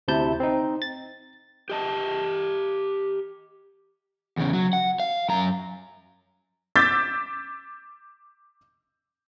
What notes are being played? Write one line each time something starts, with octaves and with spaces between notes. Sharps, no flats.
D2 C3 E4 A5 G6
C4 D#4
A6
G4 D#5 A5
E2 C#3
F#3
F#5
F5
F#2 A#5
D6 E6 G6 A6 B6